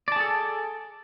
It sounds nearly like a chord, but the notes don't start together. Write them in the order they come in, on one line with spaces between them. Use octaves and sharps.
D5 A5 G#4 A4